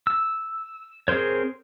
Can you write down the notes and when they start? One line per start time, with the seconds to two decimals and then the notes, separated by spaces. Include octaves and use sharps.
0.07 E6
1.08 C4 G#4 A#4 C5 C#5